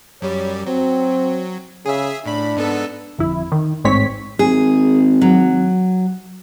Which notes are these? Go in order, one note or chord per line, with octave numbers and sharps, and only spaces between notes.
F#2 G3 C#5
F#3 C4
C#3 G#4 E5
A2 D4 B5
G#2 B3 A4
G1 F2 E4
D#3
A1 G#2 C4 C#5 B6
G#1 G#4
F#3